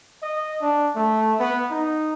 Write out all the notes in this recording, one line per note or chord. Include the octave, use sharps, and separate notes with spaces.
D#5
D4
A3
B3
D#4